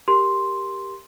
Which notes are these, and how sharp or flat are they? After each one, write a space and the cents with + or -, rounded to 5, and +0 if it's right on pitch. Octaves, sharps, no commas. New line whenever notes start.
G4 +0 A#4 +5 C6 +0